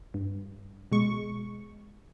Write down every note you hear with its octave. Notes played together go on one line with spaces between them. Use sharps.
G2
B2 G#3 C#6